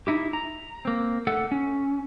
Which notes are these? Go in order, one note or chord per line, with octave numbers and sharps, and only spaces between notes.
D#4 E4 G4
A#5
A#3 C4
A3 A4 F#5
C#4